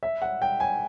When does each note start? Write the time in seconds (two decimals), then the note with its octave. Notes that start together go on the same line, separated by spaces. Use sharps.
0.03 E5
0.22 F#5
0.42 G5
0.60 G#5